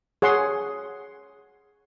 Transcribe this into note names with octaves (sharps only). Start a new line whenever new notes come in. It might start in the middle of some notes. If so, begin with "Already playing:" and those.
G#4 C#5 F#5 C6